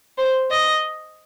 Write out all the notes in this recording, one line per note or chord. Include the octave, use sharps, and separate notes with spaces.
C5
D#5